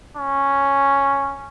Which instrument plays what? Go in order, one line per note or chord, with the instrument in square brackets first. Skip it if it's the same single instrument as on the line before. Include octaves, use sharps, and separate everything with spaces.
[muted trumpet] C#4